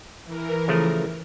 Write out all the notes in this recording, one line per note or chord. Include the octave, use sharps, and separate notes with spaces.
E3 A#4
C#3 F3 A3